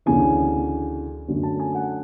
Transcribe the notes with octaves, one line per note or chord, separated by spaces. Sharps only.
D2 C#3 E3 G#5
F#2 D3 F#3 A3
A5
G#5
F#5